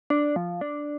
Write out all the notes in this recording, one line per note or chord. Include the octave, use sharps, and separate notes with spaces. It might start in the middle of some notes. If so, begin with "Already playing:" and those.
D4
F3
D4